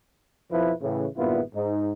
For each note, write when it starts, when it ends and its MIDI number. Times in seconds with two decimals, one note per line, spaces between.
0.51 0.73 35
0.51 0.73 41
0.51 0.73 53
0.51 0.73 64
0.51 0.73 71
0.82 1.06 45
0.82 1.06 49
0.82 1.06 52
1.17 1.41 32
1.17 1.41 43
1.17 1.41 46
1.17 1.41 59
1.17 1.41 64
1.17 1.41 65
1.55 1.92 44
1.55 1.92 63